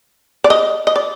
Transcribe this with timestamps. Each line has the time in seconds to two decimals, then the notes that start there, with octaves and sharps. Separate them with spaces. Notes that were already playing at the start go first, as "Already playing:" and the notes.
0.44 D5
0.50 D#5
0.87 D#5
0.96 D5